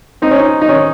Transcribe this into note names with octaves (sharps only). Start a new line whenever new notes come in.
C4 D#4
C#4
D#4
D#4
D#3 C#4